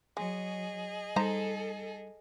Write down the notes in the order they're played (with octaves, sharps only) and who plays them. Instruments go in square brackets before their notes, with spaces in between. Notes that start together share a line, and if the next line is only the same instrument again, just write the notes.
[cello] F#3 [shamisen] G#3 [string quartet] G#4 D#5
[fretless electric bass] G3 [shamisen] D#4 C5 A#5 [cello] A4